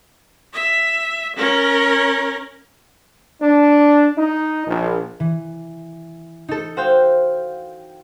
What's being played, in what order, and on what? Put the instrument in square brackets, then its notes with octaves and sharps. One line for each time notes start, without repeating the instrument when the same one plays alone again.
[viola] E5
C#4 A#4
[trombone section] D4
D#4
A#1
[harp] E3
D#4 A4
F#4 C5 F5 G5